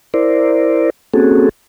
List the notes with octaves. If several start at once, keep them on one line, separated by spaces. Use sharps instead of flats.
E4 A#4 C5 D5
A#3 C4 C#4 F#4 G#4 A4